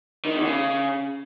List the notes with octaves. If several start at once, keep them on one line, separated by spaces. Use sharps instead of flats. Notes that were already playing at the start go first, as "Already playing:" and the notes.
D#3
E2
C#3